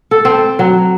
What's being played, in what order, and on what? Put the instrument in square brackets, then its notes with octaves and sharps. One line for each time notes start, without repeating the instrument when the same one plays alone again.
[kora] A4
C4
F#3